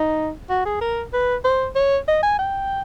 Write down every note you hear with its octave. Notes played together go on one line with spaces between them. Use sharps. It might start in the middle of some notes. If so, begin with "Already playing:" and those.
Already playing: D#4
F#4
G#4
A#4
B4
C5
C#5
D#5
G#5
G5